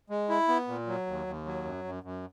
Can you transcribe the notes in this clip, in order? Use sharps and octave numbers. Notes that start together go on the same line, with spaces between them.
G#3
E4
B3
A#2
F#3
D#2
D#2
F#3
F#2
F#2
F#2